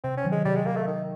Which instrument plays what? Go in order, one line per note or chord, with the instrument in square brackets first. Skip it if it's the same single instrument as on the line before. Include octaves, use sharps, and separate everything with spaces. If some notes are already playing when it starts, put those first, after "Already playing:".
[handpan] C3 [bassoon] C4
[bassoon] C#4
[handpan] D#3 F#3
[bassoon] G#3
[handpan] C3 [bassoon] G3
[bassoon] G#3
[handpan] D#3 F#3 [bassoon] A#3
[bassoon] A3
[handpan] C3 [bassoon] D#3